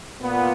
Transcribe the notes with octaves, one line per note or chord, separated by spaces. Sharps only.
A#2 B3